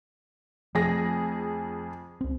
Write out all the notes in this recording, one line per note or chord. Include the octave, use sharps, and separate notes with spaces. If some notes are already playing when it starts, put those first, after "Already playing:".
F2 F3 A3 G#4 A#6
C#2 C4